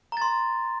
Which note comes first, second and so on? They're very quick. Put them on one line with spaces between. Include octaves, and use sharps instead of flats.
A#5 A6 C6